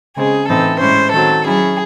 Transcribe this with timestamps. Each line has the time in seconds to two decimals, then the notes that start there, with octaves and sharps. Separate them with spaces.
0.16 C#3 G#3 C4 G#4
0.49 A2 E3 C4 D#4 A4
0.81 A2 G#3 C#4 E4 C5
1.13 D#3 F#3 C4 A4
1.46 F#3 C#4 E4 G#4